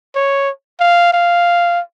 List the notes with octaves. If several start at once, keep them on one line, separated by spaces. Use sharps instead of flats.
C#5
F5
F5